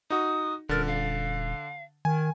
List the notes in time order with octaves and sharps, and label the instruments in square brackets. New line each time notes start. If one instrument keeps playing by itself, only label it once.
[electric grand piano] D#4 F#4 [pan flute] D#6
[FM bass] D#1 [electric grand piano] D3 A6 [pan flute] A#4
[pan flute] F5
[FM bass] D#3 [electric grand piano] G#5